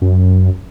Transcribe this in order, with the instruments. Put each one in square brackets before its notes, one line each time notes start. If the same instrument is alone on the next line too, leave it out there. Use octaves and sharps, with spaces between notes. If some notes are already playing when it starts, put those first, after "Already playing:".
[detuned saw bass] F#2